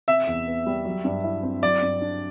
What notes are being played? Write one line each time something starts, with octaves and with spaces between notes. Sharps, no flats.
C3 E5
E2
B3
G3
F#3
G2
E4
C4
F#3 D5
G2
D4